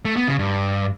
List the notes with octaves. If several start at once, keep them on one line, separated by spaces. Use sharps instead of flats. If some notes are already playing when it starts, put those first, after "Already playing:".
A3
B3
C#3
G2